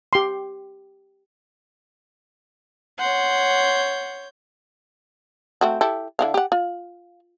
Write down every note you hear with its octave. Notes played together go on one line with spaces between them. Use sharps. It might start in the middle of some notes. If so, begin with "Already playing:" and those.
G4 C6
C#5 F#5 C6 G6
A3 C4 F#4
E4 G4 A4
D3 E4 F5
G4 F#5
F4